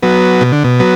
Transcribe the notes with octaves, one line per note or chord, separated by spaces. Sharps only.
F#3 B3
B2
D3
B2
F#3 B3